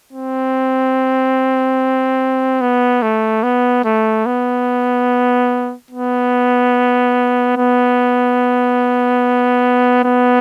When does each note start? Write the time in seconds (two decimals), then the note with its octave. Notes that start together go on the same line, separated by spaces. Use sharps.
0.13 C4
2.61 B3
3.02 A3
3.43 B3
3.85 A3
4.26 B3
5.91 B3
7.57 B3
10.04 B3